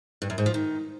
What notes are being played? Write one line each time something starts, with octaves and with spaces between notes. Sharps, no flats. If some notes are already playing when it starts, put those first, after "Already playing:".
G2
F#2
G#2
F3
D#3